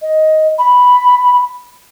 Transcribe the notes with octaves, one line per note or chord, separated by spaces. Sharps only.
D#5
B5